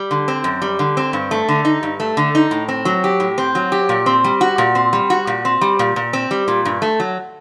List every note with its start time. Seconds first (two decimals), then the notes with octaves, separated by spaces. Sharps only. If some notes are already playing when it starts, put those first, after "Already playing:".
Already playing: G3
0.11 D3
0.28 C4
0.44 F#2
0.62 G3
0.79 D3
0.97 C4
1.13 G2
1.31 A3
1.49 D3
1.65 D#4
1.83 G2
2.00 A3
2.17 D3
2.35 D#4
2.51 A2
2.69 C4
2.85 F#3
3.04 G4
3.20 A2
3.38 C4
3.55 F#3
3.72 G4
3.89 A#2
4.06 C4
4.24 G3
4.41 F#4
4.58 A#2
4.75 C4
4.93 G3
5.10 F#4
5.27 A#2
5.45 C4
5.61 G3
5.79 A#2
5.96 A#2
6.13 C4
6.31 G3
6.48 A#2
6.65 G2
6.82 A3
7.00 F#3